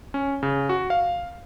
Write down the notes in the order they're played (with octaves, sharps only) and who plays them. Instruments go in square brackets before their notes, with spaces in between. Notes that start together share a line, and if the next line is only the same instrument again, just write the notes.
[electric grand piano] C#4
C#3
F#4
F5